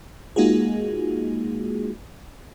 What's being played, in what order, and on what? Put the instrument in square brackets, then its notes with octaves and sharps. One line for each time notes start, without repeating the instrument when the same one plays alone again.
[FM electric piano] G#3 A#3 D#4 F4 F#4 G#4